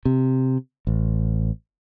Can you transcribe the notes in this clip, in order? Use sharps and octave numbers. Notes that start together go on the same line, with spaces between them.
C3
A1